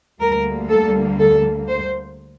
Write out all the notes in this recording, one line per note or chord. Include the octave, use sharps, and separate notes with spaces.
D2 D3 G3 A#3 A#4
A4
A4
C5